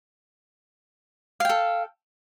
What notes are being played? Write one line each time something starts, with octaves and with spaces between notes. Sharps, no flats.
A4 F5 G5